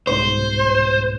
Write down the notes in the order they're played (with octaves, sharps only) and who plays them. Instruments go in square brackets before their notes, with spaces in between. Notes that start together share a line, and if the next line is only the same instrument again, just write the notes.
[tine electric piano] C2 G#2 B2 [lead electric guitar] C5